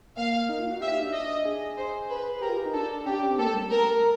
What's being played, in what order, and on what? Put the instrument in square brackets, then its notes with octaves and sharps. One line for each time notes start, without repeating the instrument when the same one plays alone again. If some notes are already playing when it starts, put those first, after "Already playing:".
[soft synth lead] A#3 [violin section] F5
[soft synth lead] D#4
F4
F#4
[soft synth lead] G4 [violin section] E5
[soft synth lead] D#4
D4
[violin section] D#5
[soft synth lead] G#4
[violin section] C5
B4
[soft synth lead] G#4
[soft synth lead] G4 [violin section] A#4
[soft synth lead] F4
G4
D#4
[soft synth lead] D4 [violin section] A4
[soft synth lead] C#4 [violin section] G4
[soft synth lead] D4
C#4
C4
[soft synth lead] A#3 [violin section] A4
[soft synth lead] A3
G3
[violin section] A#4